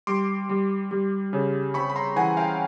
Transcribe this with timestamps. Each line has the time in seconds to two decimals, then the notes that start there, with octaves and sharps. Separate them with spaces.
0.07 G3 C6 D6
0.49 G3
0.91 G3
1.33 C#3
1.74 C4 B5 C#6
1.90 B5
1.96 A#5 C6
2.16 E3 F#5 G#5
2.37 F5 G5